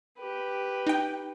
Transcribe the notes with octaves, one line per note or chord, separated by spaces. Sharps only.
G4 B4
D#4 G5